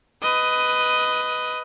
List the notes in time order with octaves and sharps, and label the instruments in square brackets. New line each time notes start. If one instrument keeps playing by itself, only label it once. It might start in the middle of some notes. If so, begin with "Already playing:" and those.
[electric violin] B4 D#5